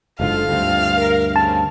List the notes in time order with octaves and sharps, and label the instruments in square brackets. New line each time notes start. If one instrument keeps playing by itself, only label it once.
[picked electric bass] F#1 G#2 D3 [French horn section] F4 A4 [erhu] F5
[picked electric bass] D2 G2 [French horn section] C4 D4 F4
[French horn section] A#4
[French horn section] C#3 C4 [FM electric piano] A5